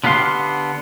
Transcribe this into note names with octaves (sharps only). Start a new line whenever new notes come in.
D3 B3 G4 F5 C6